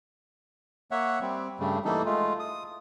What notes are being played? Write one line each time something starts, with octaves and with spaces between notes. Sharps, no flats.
A#3 C#5 E5 F#5
G3 C4
G2 C#3 G3 A3
E3 G3 A3 A#3 D#4 A4
G#3 A3 F4
D#6